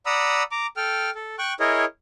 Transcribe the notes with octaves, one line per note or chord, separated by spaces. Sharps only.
D5 F#5 A#5 B5 D#6 E6
A#5 D6
A4 G5 F6
A4
G5 C#6 F#6
E4 G#4 A#4 C#5 D#5